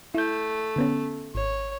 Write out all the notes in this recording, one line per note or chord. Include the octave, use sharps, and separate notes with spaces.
A3 E4 G6
D3 B3 C#4
G#1 C#5